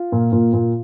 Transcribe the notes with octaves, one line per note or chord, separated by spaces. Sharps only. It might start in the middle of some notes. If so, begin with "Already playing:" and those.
Already playing: F4
A#2
A#2
A#2